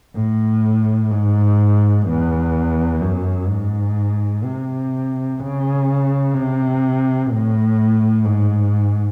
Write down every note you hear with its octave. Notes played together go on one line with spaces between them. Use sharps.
A2
G#2
E2
F#2
G#2
C3
C#3
C3
A2
G#2